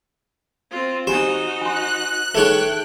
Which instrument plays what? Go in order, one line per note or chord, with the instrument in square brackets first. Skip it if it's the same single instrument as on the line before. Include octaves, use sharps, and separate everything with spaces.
[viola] C4 F4
[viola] D#4 F#4 [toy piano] G4 G#5 [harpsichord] C5
[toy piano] G#5 C6 [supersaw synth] F#6
[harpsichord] A3 C#5 C#6 [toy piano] D#4 G#4 B4 [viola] G5